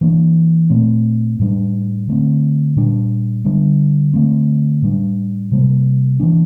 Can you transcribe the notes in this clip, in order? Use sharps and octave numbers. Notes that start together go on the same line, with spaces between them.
E3 A#3 D4
A#2 A3 C4
A2 G3 D4
D3 A3 C4
A#2 G3 D4
D3 G3 D4
D3 A3 C4
A2 G3 D4
C3 G3 A#3
E3 A#3 D4